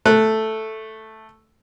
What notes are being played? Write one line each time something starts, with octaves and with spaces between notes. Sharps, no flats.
A3 F#6